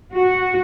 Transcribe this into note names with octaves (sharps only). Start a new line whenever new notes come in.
F#4